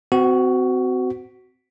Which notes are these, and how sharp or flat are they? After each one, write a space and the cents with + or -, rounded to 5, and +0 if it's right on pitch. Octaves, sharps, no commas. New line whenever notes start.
C4 -30 F#4 +10